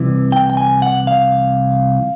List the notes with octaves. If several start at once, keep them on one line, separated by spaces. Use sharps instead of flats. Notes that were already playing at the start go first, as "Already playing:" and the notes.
Already playing: C2 C3 E3
G5
G5
G#5
F#5
F5